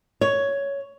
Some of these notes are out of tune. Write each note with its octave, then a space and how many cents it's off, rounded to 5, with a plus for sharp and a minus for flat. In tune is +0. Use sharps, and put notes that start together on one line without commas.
C#5 +10